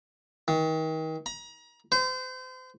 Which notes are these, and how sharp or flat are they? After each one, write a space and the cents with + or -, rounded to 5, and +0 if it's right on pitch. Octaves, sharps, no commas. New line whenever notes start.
D#3 +35
A#5 +35
C5 -35